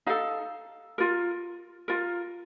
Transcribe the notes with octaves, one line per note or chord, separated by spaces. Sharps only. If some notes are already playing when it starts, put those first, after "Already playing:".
D#4 A4 F5
F4 A#4
F4 A#4